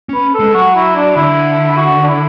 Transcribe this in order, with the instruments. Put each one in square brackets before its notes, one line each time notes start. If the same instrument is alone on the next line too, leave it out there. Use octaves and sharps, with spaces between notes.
[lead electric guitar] C#4 [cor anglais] B4
[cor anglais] A4
[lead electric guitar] G#3
[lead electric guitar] F#3 [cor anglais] F#4
[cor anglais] E4
D4
[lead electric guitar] D3 [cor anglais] E4
[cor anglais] E4
F#4
D4
E4